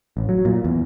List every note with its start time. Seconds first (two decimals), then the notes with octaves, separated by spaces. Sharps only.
0.17 A1
0.29 F#3
0.45 A#2
0.64 E2